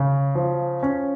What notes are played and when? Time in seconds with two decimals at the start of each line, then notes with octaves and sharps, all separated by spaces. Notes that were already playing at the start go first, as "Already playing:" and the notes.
Already playing: C#3
0.35 F3
0.83 C#4